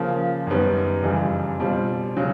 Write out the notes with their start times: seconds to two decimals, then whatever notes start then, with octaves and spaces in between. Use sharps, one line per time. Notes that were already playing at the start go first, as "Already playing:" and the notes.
Already playing: C#3 F3 A#3
0.47 F#2 D#3 G3 B3
1.03 F2 C#3 E3 G3
1.59 B2 G3 C4 F4
2.17 C#3 F#3